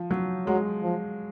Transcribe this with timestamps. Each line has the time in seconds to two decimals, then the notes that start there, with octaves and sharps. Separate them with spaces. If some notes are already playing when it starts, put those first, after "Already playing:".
Already playing: F3
0.11 F#3
0.47 F#3 G#3
0.83 F3